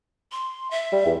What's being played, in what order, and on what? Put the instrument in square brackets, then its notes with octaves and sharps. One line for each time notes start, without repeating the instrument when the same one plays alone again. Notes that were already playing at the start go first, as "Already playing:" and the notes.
[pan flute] C6
E5
[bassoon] G3
E2